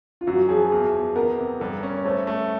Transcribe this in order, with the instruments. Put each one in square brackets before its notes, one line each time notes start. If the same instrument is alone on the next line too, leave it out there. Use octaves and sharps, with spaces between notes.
[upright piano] F4
[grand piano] F#2 [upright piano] F#4
[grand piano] F3 [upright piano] G#4
[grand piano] E2
E2
[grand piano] B3 [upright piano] A#4
[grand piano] C3
[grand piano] G2 [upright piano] A4
[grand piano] C#4
[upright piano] C#5
[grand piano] A3 [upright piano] C5
[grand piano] A3